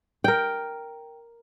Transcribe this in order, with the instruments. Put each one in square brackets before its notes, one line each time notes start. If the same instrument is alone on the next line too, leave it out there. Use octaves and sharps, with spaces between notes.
[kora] A#4 G5